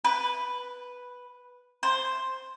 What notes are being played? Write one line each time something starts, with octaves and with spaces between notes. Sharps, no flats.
B4
C5